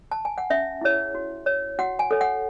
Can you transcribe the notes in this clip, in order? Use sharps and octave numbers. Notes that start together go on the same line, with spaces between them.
A5
G#5
F#5
C#4 E5
E4 G#4 C#5
F#4
C#5
F#4 F#5
G#5
A4 C#5
F#5